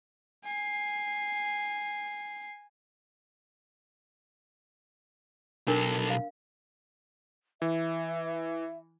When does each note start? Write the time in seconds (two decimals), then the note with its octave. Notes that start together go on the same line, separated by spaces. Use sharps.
0.44 G#5 C7
5.68 B1 D4 A4 A#4
6.10 F5
7.62 E3 E5